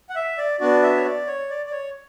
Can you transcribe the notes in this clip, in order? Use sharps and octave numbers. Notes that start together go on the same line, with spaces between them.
F#5
E5
D5
B3 D4 F#4 D5
E5
C#5
D5
C#5
D5
D5
C#5